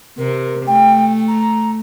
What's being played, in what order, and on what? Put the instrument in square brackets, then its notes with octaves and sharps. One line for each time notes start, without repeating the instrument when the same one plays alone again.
[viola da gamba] C3 [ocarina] A#4
[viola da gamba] A3 [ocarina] G5
[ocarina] A#5